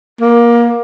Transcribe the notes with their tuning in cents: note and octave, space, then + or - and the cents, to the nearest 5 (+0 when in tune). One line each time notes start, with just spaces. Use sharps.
A#3 +20